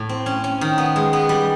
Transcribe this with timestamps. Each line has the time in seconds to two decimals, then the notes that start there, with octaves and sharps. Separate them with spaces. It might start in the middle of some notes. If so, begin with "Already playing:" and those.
Already playing: A2
0.09 C4
0.26 C#4
0.44 C#4
0.61 D#3
0.78 B3
0.96 G#3
1.13 B3
1.29 G3